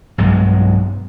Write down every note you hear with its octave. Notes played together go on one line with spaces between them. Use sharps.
B1 G2 F#3 G#3